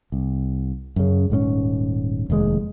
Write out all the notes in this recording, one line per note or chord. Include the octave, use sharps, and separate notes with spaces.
C2
F#2 C#3
D#1 G#2 G3 C#4
F1 D#2 C#3 G#3